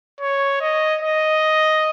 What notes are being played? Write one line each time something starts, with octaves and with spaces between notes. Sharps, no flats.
C#5
D#5
D#5